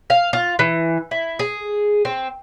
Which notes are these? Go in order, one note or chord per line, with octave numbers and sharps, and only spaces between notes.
F5
F4
E3
E4
G#4
C4